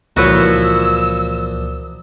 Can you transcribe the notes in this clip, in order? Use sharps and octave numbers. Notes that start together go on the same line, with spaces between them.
C#2 A#2 E3 F3 F#4 B4 C#5 E6